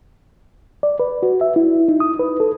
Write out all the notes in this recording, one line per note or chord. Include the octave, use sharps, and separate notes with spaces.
D5
B4
F#4
E5
E4
D#4
D#6
B4
A4